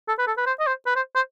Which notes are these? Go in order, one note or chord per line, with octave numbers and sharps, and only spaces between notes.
A4
B4
A4
B4
C5
D#5
C5
B4
C5
C5